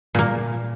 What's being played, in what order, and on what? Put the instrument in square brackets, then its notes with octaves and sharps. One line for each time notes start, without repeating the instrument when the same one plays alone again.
[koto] A#2 A#3